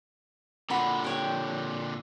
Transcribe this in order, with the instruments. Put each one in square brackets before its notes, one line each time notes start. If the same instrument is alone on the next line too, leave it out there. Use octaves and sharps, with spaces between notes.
[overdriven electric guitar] A#2 D3 [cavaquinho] F#4 B5 C6
[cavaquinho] G4 C#5 G5